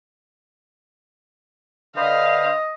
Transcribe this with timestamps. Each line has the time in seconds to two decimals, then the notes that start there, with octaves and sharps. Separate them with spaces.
1.96 D3 B4 C5 D#5 F5